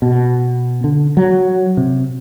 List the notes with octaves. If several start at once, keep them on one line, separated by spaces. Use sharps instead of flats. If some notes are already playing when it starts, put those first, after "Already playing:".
B2
D3
F#3
C3